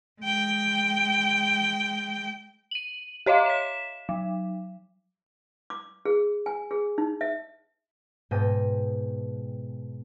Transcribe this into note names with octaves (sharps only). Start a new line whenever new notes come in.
G#3 G5
D#7 F#7
G4 C#5 D#5 F5
B6 E7
F#3
D6
G#4
G#5
G#4
D#4
E5
G#2 B2 G5 A#6 D#7